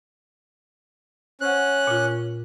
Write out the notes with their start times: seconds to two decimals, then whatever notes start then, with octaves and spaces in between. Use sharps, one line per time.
1.41 C#4 C5 F#5 F#6
1.87 A#2 F4